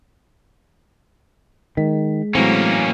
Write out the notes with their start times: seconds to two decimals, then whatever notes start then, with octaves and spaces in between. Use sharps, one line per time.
1.77 D#3 G#3 B6
2.35 A2 E3 F#3 A#3 C4 C#4